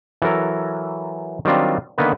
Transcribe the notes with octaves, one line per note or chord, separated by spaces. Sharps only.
E3 F#3 A4 A#4
D#3 F#3 G3 C4 D4 F4
D3 D#3 A#3 B3 B4